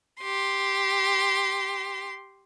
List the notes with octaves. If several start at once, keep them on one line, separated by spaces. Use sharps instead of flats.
G4 C6